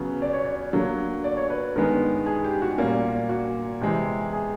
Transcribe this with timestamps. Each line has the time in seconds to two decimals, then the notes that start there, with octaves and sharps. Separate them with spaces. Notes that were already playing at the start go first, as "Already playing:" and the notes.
Already playing: C#3 F#3 B3
0.22 D5
0.33 C#5
0.44 D5
0.73 D3 F#3 A#3
1.24 D5
1.37 C#5
1.50 B4
1.75 G2 D#3 G#3 B3 A#4
2.26 G#4
2.44 G4
2.62 F#4
2.78 A#2 G3 A#3 C#4
3.29 F#4
3.81 C3 E3 G#3 G4
4.33 G#4